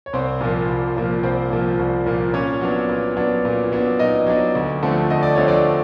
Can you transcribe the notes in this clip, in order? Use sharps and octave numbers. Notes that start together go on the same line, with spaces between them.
C#5
C2 C4 C5
A#2 F3 A#3
C2
A#2 F3 A#3
C2 C4 C5
A#2 F3 A#3
C2
A#2 F3 A#3
A#2 C#4 C#5
F#3 B3 D4
A#2
F#3 B3 D4
A#2
F#3 B3 D4
A#2 D#4 D#5
F#3 B3 D4
D2
D3 F3 A3 C4
D2 D#5
D5
D3 F3 A3 C4 C#5
D4 D5